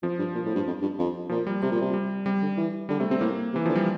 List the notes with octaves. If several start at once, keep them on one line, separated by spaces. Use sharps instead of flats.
F2 F3
G2
A#2
A2
G2
F2
G2
F2
A#2 F3
G3
C3 G3
A#2
C3
G3
C3 G3
D3
E3
D3 G3
C3 A3
C3 C4
A2 A#3
C3
E3
D3 F3
G3